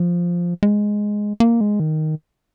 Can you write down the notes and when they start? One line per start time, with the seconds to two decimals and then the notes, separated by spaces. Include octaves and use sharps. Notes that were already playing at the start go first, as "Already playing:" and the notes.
Already playing: F3
0.63 G#3
1.40 A#3
1.61 G#3
1.80 D#3